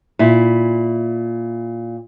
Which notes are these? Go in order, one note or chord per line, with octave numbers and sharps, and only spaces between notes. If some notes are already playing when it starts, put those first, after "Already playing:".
A#2 E4